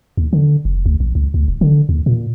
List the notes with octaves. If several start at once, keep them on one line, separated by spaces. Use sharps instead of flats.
D#2
D3
F1
D2
A#1
C#2
D2
D#1
D3
D#2
A#2